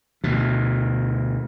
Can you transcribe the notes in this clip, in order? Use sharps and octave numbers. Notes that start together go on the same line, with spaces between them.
D2 B2